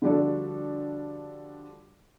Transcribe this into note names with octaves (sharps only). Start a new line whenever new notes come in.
D3 F3 G3 D4 F#4 A4